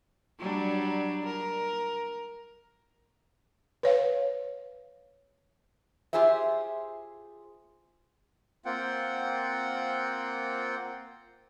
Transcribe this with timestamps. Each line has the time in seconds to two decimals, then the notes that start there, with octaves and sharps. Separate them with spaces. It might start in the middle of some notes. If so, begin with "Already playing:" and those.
0.39 F#3 G3 D4
1.26 A#4
3.83 B4 C#5 F5
6.13 F4 G4 G#4 C5 E5
8.65 A#3 C4 F4 F#5 G5